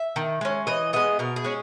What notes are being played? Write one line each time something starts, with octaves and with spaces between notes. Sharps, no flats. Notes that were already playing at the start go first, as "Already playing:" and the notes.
Already playing: E5
D#3
G#3 C#4
E3 D#5
G#3 B3 D#5
B2 A#4
G#4
G#3 C#4